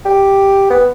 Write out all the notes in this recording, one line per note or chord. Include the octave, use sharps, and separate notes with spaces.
G4
B3